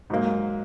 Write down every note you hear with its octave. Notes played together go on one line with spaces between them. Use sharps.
G#2 F#3 A#3